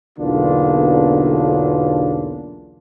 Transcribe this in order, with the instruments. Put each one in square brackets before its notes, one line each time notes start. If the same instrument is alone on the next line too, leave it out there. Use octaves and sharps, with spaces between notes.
[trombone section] B1 E2 D3 A#3 D4 F4